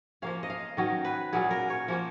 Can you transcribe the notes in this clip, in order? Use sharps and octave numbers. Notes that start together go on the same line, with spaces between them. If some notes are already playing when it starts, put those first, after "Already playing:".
F3 A#3 C#4 F5
D#5
F5
D#3 F#3 C#4 D#5
B4
A#2 F#3 C#4 G#4
A#4
C#5
F3 A#3 C#4